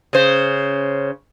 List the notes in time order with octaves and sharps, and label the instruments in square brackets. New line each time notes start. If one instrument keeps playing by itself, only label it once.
[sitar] C#3 C5